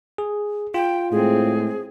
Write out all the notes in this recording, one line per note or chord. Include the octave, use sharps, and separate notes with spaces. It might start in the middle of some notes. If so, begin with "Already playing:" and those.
G#4
F4 G5
A2 G#3 C4 G#4